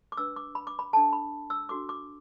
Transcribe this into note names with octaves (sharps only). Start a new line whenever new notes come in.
D6
D4 B4 E6
D6
B5
D6
B5
D4 A4 A5
B5
E6
D4 F#4 A4 D6
D6